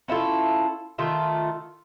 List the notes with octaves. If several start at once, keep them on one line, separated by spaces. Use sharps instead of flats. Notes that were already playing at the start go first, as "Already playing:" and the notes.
C#4 E4 F4 A4
D#3 A3 F4 E5